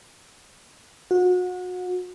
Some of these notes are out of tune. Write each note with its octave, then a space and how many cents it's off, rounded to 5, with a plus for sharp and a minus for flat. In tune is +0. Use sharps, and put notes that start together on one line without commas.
F#4 -30